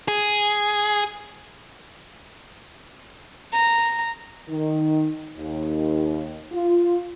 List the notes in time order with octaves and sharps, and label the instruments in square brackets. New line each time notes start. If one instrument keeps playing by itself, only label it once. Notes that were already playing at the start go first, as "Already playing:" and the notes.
[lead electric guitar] G#4
[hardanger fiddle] A#5
[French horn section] D#3
D#2
F4